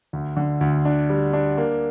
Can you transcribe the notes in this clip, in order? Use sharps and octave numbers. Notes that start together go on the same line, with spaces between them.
D2
D3
D2
D4
G3
D4
A#3